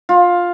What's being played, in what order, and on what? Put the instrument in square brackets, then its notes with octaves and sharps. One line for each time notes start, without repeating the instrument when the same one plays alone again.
[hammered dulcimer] F4